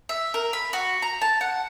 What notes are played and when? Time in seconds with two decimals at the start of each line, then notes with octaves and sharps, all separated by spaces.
0.09 E5
0.34 A#4
0.53 B5
0.73 F#4
1.02 A#5
1.21 A5
1.41 F#5